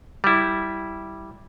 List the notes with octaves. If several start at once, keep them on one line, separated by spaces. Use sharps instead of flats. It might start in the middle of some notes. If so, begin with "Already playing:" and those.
G3 E4